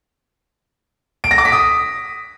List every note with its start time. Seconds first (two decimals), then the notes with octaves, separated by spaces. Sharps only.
1.24 D7
1.31 A#6
1.38 D6
1.45 B6
1.52 D#6